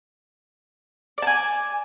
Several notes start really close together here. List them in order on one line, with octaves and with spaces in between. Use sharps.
D5 A5 G#5